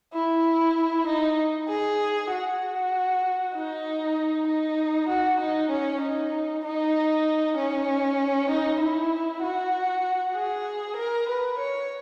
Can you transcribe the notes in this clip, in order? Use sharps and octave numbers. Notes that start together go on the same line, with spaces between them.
E4
D#4
G#4
F#4
D#4
D#4
F#4
D#4
C#4
D#4
D#4
C#4
D#4
E4
F#4
G#4
A#4
B4
C#5